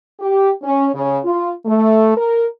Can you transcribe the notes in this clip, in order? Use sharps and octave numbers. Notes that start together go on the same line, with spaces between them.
G4
C#4
C#3
F4
A3
A#4